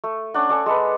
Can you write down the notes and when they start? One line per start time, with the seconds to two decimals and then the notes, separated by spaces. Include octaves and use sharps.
0.04 A3
0.34 C#4 D4 F#5
0.49 D4 A4 G#5
0.66 G#3 A4 B4